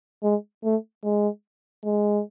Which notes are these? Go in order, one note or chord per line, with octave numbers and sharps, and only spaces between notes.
G#3
A3
G#3
G#3